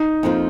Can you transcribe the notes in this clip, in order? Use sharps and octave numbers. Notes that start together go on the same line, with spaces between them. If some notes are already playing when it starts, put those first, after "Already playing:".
Already playing: D#4
F2 F3 A#3 F4